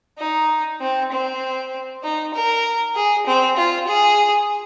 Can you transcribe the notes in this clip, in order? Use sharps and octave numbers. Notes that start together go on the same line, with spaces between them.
D#4
C4
C4
D#4
A#4
G#4
C4
F4
G#4